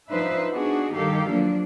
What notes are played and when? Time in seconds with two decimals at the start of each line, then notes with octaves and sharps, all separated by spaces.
0.11 F3 D4 D#4 B4 C5 E5
0.52 B3 D4 D#4 F#4 G#4
0.94 G2 D#3 G4 A4 F5
1.29 F3 F#3 A#3 D4